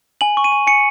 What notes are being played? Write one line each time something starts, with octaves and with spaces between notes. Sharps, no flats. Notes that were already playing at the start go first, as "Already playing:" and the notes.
G#5 F#7
C#6
D#7
G#5
G#5 C#7